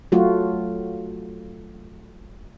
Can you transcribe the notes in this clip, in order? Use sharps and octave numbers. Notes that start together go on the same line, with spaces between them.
F#3 A3 F4 F#4